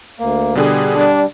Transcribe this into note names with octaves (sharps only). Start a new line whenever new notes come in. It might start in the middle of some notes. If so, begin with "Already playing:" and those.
D2 A#3
B2 D3 G3 G#4
G3 D4